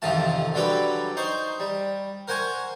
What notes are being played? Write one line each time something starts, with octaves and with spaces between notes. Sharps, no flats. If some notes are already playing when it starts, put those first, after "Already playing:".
A1 F2 C3 D#3 F4 A5
D3 F#3 G3 A4 B4 D5
D#4 C5 C6 C#6
G3
A#4 C5 F#5 G#5 C#6